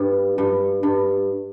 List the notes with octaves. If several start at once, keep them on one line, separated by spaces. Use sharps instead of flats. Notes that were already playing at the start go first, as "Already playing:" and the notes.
Already playing: G2 G3
G2
G2